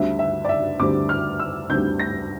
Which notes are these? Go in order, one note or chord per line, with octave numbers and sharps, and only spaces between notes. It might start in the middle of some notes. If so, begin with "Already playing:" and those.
Already playing: D2 D3 G3 C4 E5
E5
D5
E5
D2 D3 G3 C4 D6
F6
E6
D2 D3 G3 C4 G6
A#6